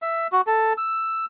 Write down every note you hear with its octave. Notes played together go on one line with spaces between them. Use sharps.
E5
F#4
A4
E6